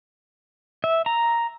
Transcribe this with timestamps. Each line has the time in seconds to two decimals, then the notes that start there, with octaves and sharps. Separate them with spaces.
0.84 E5
1.06 A#5